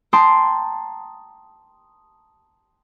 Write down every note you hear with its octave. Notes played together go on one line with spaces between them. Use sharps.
G5 A5 A#5 C6 D#6